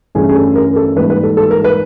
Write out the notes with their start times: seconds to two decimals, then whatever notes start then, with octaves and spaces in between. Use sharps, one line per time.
0.15 G2 E3 A3 C#4 E4 G#4
0.29 G#4
0.35 A4
0.55 A#4
0.76 A4
0.96 G#2 E3 G3 A#3 B4
1.10 B4
1.23 A4
1.37 A4
1.51 A#4
1.64 B4